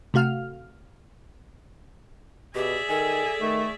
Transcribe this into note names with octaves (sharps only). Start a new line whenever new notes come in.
C3 A3 F#4 F5 F6
B2 G4 G#4 D5 E5
D#3 A4 G#5
D#3 A3